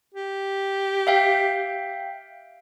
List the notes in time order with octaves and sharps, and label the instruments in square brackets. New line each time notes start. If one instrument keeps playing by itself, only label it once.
[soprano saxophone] G4
[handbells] E5 F5 G5